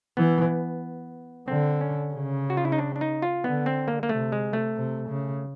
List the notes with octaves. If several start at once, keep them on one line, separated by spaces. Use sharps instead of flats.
E3 B3
D3 C4
C#4
C#3
F#4
F4
E4
D#4
D4
D4
D#4
F4
D3 B3
C4
A#3
A#3
C3 A3
G#3
A3
C3
C#3